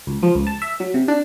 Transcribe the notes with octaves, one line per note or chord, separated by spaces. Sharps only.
C#2
F3
C#2
A5
E5
F#3
C3
D4